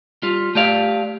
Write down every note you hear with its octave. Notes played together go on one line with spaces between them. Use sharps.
G3 F4
A3 G4 D5 F5